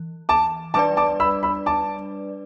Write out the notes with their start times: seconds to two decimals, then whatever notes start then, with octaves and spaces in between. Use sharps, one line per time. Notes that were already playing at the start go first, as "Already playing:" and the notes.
Already playing: E3
0.29 A5 D6
0.74 G3 D4 B4 D5 A5 D6
0.97 A5 D6
1.20 B5 E6
1.43 B5 E6
1.66 A5 D6